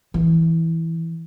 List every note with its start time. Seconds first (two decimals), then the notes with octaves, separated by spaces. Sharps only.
0.14 E3